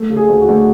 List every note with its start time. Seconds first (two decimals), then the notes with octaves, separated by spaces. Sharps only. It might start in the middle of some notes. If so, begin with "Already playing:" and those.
Already playing: A3
0.10 C#3
0.16 G#4
0.29 D2
0.41 F#4
0.48 D2